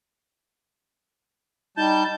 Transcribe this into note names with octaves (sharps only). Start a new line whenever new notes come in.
G3 D#4 A5 G6